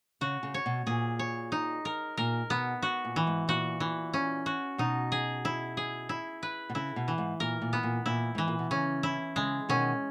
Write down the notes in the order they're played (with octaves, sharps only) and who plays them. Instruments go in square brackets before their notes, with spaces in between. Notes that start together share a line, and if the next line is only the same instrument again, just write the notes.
[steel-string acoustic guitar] C#3 [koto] F#4
[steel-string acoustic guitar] C#3
[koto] C#5
[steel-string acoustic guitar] B2
[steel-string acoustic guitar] A#2 [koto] G#4
[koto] C#5
D#4
A#4
[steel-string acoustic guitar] A#2 [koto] A#4
[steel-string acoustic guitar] B2 [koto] B3
[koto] F#4
[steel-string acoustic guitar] A#2
[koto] E3
[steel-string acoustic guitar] G#2
[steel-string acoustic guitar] A#2 [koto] F#4
[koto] E3
C#4
F#4
[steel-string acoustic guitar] B2 [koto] D#4
[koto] G#4
E4
G#4
E4
B4
[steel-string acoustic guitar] B2
[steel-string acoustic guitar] C#3 [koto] E4
[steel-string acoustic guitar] B2
[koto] E3
[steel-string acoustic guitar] G#2
[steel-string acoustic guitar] A#2 [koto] A#4
[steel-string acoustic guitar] A#2
[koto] B3
[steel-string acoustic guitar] A#2
[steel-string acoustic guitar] A#2 [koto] E4
[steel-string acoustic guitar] G#2 [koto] E3
[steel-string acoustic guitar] A#2
B2
[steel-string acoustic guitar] C#3 [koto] C#4
[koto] E4
[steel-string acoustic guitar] C#3 [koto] G#3
[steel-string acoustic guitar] B2 D#3 [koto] C#4